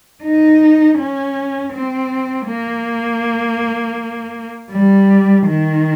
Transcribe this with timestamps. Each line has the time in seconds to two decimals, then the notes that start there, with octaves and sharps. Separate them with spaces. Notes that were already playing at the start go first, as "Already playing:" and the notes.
0.23 D#4
0.98 C#4
1.73 C4
2.47 A#3
4.70 G3
5.46 D#3